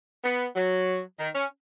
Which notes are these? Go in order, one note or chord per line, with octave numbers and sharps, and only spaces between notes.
B3
F#3
D#3
C#4